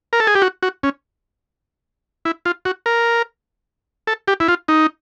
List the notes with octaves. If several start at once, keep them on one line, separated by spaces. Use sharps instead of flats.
A#4
A4
G#4
G4
F#4
F#4
C#4
E4
F4
F#4
A#4
A4
G4
E4
F4
D#4